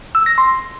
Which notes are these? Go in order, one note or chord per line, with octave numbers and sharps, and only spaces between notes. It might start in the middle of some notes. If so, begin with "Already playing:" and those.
E6
A#6
C6